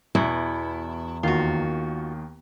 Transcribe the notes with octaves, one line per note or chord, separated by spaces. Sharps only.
E2 B2 E4
D#2 D#3 F4 F#4